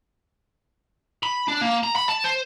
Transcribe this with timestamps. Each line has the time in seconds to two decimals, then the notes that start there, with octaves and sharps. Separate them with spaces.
1.23 B5
1.48 D4
1.61 A#3
1.83 A#5
1.96 B5
2.09 A5
2.24 C5